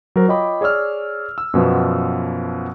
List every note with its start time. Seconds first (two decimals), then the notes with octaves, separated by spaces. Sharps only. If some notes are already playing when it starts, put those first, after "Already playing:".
0.16 F#3 A#4 C5
0.28 F4 C#5 D#5 G5 B5 D6
0.61 G#4 C#5 D5 E6 F6
1.38 E6
1.54 F#2 B2 F3 B3